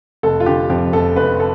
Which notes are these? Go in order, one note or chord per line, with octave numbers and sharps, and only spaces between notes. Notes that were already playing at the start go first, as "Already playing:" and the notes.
F1 A4
F4
D3 G4
F2 G4
F1 A4
F1 B4
A4